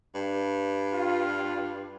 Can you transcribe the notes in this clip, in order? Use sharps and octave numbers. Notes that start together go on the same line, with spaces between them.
G2
F4